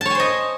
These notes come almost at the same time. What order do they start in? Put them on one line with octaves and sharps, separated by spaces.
A5 C#5 G#5 C5 D#5